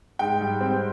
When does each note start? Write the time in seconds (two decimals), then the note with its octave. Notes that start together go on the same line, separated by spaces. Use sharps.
0.19 G#2 G5
0.40 G3
0.60 C4